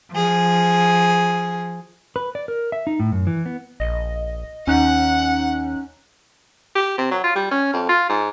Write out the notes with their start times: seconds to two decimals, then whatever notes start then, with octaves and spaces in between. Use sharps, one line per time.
0.13 F3 G#4
2.16 B4
2.35 D5
2.48 A#4
2.72 E5
2.87 D#4
3.00 A2
3.12 F#2
3.27 E3
3.46 B3
3.80 A#1 D#5
4.67 D#2 C#4 D#4 F#5 F#6
6.75 G4
6.98 C3
7.11 F#3
7.24 F4
7.36 G3
7.51 C#4
7.73 F2
7.89 F4
8.10 G#2